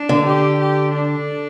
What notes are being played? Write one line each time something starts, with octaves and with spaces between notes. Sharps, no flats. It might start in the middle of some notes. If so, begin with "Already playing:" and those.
Already playing: D4
D3
G4
G4
D4